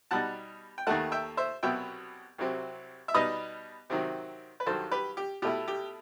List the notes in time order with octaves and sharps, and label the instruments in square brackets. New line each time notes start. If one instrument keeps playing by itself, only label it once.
[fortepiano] B2 G3 D#4 F#5 A5
G5
D#2 D#3 A3 F#5 A5
E5 G5
C5 E5
C2 B2 F#3 B3 E5 G5
C2 C3 F#3 C4
E5
B2 G3 D#4 B4 D#5
C3 D#3 F#3 C4
B4
G2 D#3 F#3 A4 C5
G4 B4
G4
B2 A3 E4 G4
G4